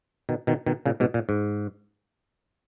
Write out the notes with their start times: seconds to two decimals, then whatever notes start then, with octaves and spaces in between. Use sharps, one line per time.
0.29 B2 D#3
0.47 B2 D#3
0.66 B2 D#3
0.86 A#2 C#3
1.00 G#2 B2
1.14 A#2
1.29 G#2